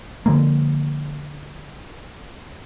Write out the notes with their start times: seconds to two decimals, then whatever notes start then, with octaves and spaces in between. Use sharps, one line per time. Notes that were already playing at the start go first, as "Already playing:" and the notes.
0.26 D3 F3 G#3 A#3